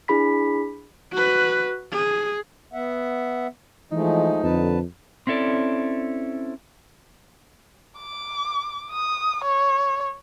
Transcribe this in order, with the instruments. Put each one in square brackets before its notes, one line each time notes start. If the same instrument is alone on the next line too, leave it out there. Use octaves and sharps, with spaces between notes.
[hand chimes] D4 E4 G#4 B5 B6
[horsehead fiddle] F#4 B4
G#4
[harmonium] B3 E5 F#5
[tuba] E3 [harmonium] F3 G#3 A3 [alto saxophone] D#4
[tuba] F2 [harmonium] D3 B4 A5
[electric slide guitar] C4 C#4 E4 A4 D5
[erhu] D6
D#6
C#5